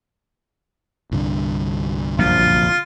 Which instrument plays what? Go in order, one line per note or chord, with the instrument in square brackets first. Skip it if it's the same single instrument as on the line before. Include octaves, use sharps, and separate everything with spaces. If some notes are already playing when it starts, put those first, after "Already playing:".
[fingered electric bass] C2 G2 D3
[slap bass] A#1 F#2 [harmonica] F4